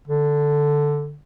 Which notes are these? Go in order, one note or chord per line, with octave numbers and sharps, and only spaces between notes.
D3